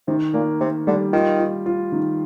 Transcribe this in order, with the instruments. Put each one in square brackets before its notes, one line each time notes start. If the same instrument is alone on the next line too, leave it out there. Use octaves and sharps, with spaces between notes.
[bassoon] C3 [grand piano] D#3
[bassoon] A#2 [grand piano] A#3
[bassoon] C3 [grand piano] A#3
[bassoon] D3 [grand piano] G3
[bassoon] D#3 [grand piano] F4
[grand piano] F4
F4
D#3